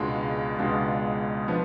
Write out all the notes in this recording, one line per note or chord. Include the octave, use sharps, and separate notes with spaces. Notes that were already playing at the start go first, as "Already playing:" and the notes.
Already playing: C#2 B2 G#3 D4 F4
C#2 B2 G#3 D4 F4
F3 B3 D4